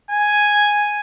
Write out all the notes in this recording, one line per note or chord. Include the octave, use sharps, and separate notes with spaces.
G#5